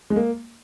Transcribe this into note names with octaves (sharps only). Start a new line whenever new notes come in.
G#3
A#3